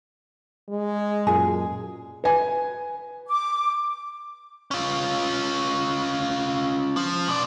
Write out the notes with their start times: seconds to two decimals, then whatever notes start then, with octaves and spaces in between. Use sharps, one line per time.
0.69 G#3
1.27 F#2 A#2 G#4
2.24 B4 G#5
3.29 D6
4.71 C#4 F4
6.97 F3
7.28 B2 D5